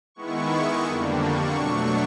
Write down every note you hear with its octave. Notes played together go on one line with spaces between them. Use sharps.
D#3 G#3 B3 E4 C#6
F2 D3 G3 A#3 D4
C#6
B2 F#3 A3 D4 C#6